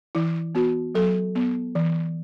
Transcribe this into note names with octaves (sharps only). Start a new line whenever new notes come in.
E3 E4
B3 F#4
F#3 A4
B3
E3